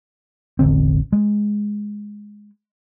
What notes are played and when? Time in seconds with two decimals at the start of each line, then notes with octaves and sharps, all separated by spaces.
0.59 E1 A1 D3 C4
1.13 G#3